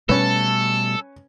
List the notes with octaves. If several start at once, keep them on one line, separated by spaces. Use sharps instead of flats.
B2 G3 A3 C#4 A4 B4